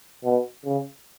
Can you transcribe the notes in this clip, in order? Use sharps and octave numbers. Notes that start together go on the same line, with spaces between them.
B2
C#3